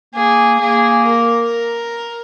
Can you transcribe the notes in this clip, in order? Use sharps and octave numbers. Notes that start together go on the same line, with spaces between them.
A#3 G#4
A#3 G#4
A#4